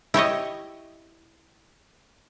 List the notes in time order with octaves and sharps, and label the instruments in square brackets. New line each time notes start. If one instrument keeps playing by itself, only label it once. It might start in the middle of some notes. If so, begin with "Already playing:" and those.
[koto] E4 G4 C#5 D#5